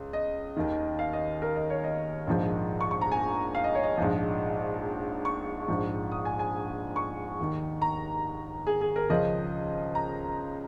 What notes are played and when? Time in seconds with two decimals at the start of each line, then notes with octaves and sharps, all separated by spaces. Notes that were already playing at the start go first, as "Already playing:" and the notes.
Already playing: C#2
0.13 D#5
0.56 D#2 D#3
0.99 F5
1.13 D#5
1.42 A#4
1.56 D#5
1.70 C#5
1.84 D#5
2.27 A#1 G#2 F3
2.81 C#6
2.91 C#6
3.01 A#5
3.12 G#5
3.55 F5
3.64 D#5
3.75 C#5
3.83 D#5
3.97 A#1 G#2 F3
5.25 C#6
5.68 A#1 G#2 F3
6.12 D#6
6.25 G#5
6.39 G#5
6.96 C#6
7.40 D#2 D#3
7.82 A#5
8.67 G#4
8.81 G#4
8.96 A#4
9.10 C#2 C#3 F3 D#5
9.95 A#5